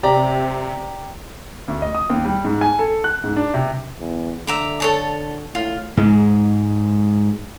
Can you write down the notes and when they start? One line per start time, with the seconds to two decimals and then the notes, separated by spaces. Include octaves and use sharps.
0.03 C3 G4 D5 A#5
1.68 D2
1.82 D#5
1.95 D#6
2.10 D#2
2.25 G3
2.44 G#2
2.61 G#5
2.79 A4
3.04 F#6
3.24 G#2
3.36 D4
3.54 C3
4.00 E2
4.47 D3 E5 A#5 D6
4.80 A4 C#5 A5
5.55 A2 F4
5.97 G#2 G#3